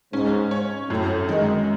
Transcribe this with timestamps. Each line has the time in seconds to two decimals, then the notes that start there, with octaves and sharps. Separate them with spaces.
0.13 G#2 C#4
0.51 C#5
0.90 F#2 A2
1.29 D#3 G#3